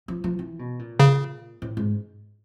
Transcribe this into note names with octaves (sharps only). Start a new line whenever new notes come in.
F3
F3
E3
B2
A#2
C#3
A2
G#2